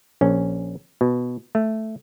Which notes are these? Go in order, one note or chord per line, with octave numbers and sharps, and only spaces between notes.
A#1 C#4
B2
A3